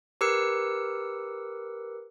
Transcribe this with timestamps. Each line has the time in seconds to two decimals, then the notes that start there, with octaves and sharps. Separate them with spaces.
0.21 G4 A#4 B4 E6 C#7